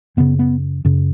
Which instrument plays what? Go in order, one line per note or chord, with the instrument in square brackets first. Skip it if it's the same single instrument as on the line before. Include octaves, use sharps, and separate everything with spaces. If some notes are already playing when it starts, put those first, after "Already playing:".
[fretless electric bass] F#2 C#3 B3
B3
F#2 C#3